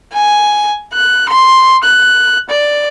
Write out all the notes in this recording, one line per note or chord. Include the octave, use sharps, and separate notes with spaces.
G#5
F#6
C6
F#6
D5